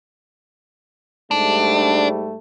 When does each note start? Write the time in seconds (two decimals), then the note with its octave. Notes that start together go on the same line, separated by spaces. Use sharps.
1.31 G#2 G3 A3 D4